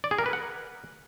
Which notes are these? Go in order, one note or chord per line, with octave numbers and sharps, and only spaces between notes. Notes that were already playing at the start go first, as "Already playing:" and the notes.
D5
G#4
A#4
B4
F#5